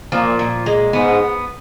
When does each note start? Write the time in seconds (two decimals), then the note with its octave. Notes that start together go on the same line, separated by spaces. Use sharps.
0.12 A#2 F3
0.39 A#2
0.66 G#3
0.93 G#2 B3